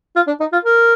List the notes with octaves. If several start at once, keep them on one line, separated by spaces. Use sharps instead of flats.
F4
D4
D#4
F4
A#4